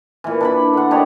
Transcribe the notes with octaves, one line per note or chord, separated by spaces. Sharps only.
A#2 E3
D4 D5 B5
D3 F#5
D4 G4 C#5 D#5